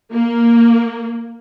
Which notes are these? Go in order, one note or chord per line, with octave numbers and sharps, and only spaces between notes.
A#3